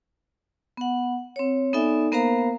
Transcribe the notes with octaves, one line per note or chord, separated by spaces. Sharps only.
B3 F#5
C4 C#5
B3 D#4 A4 D5 E5 G#5
A#3 B3 A#4 C5 F5 A#5